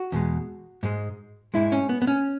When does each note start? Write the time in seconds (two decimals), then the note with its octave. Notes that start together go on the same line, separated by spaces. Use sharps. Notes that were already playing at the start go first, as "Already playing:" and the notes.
Already playing: F#4
0.12 E2 B2 G#3
0.83 G#2 G#3
1.54 G#2 G#3 E4
1.72 C#4
1.89 B3
2.02 B3
2.07 C#4